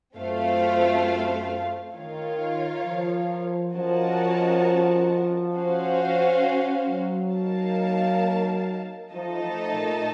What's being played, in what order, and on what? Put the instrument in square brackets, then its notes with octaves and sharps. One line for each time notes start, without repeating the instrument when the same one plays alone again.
[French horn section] F#2 [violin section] A3 C4 F4 C5 F5
[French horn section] D#3 [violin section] F4 A#4 C#5 F5
[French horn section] F3
[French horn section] F3 [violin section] C#4 F#4 A#4 D#5 A5
[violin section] C#4 F#4 C5 F5
[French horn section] F#3
[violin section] A#3 D#4 A#4 F5 A5
[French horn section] F3 [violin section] A3 D#4 A4 D#5 A5
[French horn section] F3
A#2